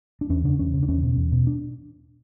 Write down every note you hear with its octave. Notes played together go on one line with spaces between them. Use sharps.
D4
E2 C#4
C#3 D4
E2 C#4
C#3
D4
E2 C#4
B2
E2
B2
D4